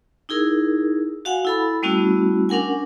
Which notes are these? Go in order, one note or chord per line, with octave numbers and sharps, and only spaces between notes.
D#4 E4 G#4 A#4
F#4 F5 F#5 G#5
E4 A4 B5
G3 A3 B3 C#4 E4 F#4
C#4 D4 A#4 F#5 G#5